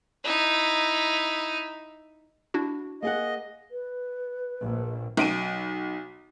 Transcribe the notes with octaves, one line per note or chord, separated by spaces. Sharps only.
D#4 E4
D4 E4 F#4
A#3 G#4 D#5 F#5
B4
A#1
B1 D7 D#7